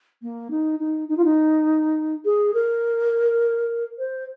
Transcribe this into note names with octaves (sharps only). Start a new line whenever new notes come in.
A#3
D#4
D#4
D#4
F4
D#4
G#4
A#4
C5